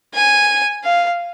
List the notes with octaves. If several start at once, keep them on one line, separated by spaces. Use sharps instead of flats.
G#5
F5